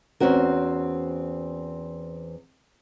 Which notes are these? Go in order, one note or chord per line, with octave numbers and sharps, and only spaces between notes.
E2 C4 C#4 F#4 A#4